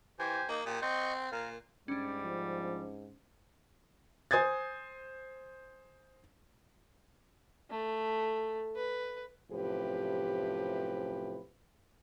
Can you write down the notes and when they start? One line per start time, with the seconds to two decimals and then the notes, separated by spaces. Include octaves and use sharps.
0.19 E3 G4 C5 G#5
0.49 A#3 D#4
0.66 A#2 G4 D#6
0.82 C4 D#5 C#6 G6
1.32 A#2 A#4 F5
1.88 G#2 G3 C#4 D4
2.24 F3
4.31 C5 G#5 D#6 G#6 A6
7.70 A3
8.76 B4
9.50 F#2 A2 C3 F3 G4 B4